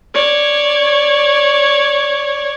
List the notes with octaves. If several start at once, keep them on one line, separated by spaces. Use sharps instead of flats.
C#5 D5 G#6